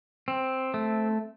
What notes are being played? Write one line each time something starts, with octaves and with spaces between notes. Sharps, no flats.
C4
A3